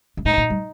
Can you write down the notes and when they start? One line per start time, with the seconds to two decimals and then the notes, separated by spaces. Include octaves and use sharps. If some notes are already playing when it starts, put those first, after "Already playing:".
0.17 G2
0.25 A2 D#4
0.37 A#2
0.50 G3